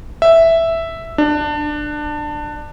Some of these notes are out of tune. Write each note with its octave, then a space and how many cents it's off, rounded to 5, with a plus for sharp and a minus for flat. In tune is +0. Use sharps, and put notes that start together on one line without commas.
E5 +0
D4 +20